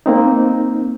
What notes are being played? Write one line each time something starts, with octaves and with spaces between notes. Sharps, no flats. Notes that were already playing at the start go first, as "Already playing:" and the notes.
A#3 C4 D#4